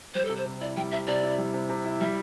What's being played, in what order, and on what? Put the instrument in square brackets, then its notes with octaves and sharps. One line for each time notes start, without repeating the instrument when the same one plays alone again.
[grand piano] G3 [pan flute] C5
[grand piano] C3 [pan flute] A4
[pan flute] C5
[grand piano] C3
[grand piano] E4 [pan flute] D5
[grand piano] G3 [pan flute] G5
[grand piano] C3 [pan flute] E5
[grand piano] C3 [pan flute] D5
[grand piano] E4
G3
C3
C3
E4
[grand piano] G3 [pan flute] E5